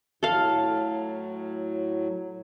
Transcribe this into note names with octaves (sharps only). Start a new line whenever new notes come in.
A2 F#3 A4 F5